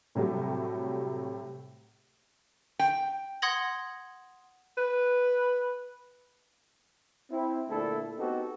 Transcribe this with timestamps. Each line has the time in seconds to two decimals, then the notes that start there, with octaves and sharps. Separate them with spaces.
0.15 A2 C3 F#3 G3 A3
2.79 G5
3.42 F#5 C6 D#6 G#6 A#6 F#7
4.77 B4
7.30 C4 E4
7.69 D2 A#2 A3 D4 E4 A4
8.17 B3 C4 D#4 F#4 G4 A4